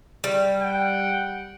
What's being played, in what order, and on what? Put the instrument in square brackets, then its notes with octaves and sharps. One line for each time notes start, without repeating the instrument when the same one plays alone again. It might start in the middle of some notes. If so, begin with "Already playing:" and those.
[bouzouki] G3
[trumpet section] F#5 G5